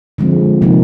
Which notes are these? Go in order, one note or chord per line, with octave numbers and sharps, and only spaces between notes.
D3 F3 G#3 C4
C3 F3 A#3 D#4